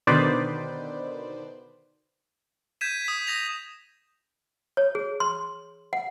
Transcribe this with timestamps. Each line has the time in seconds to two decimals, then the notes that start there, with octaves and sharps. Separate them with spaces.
0.07 B2 D3 D#3 B4 C5 D5
2.81 G6 G#6 B6 D#7 E7
3.04 D#6 B6
3.27 D#6 A#6 F7
4.77 C#5
4.95 G#4
5.20 C6
5.93 F#5